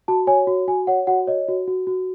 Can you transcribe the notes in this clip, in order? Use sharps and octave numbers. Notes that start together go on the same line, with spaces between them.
F#4 A5
C#5 G#5
F#4
F#4 G#5
C#5 F#5
F#4 F#5
C#5 D#5
F#4
F#4
F#4